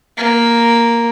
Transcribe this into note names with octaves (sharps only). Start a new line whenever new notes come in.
A#3